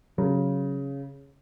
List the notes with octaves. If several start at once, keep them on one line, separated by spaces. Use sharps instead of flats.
C#3 F#3